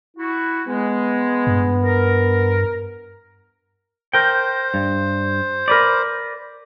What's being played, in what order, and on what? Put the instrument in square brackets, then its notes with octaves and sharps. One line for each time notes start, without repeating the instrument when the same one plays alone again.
[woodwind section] E4 F#4
[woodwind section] G#3 [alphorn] B3
[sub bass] G2
[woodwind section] A#4
[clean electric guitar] A#4 G5 [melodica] C5
[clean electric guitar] G2
A#4 B4 D5